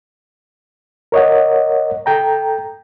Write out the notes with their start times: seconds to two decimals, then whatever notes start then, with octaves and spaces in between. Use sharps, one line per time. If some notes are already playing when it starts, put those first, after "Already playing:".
1.12 A#4 C#5 D#5 F#5
2.06 A4 G5 A#5